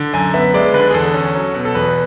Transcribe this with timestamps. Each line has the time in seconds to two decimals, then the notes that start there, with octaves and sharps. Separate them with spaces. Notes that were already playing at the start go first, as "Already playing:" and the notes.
Already playing: D3
0.13 F#2 G#5
0.34 B3 E5
0.54 G#3 D5
0.74 D3 B4
0.90 G#4
0.94 E2 A4
1.14 C#4
1.35 F#3
1.55 B2
1.65 A4
1.75 E2 B4